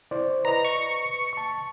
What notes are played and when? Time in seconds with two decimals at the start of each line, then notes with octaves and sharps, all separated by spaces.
0.11 E4 C5 D5
0.45 B4 D#5 A#5
0.65 C#6
1.33 A5 C#6